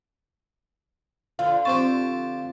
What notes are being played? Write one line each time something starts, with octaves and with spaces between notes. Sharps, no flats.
D3 F3 F4 F5
C4 G4 C5 A5 C#6